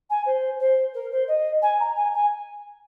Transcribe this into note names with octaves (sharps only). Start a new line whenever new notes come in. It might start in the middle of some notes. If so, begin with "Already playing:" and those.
G#5
C5
C5
A#4
C5
D#5
G#5
A#5
G#5
G#5